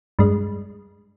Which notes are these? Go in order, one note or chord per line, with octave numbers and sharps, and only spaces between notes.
G2 G#3